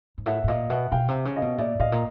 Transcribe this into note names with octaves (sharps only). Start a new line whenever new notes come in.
G#2
A2 E5 F#5
A2
A#2 D#5 F5
B2 E5 F#5
B2 F5 G5
C3
C#3
D#5 F5
B2
A#2 D5 E5
A2 D#5 F5
A#2